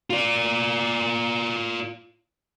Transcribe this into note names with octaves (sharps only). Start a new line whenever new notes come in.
F4 D5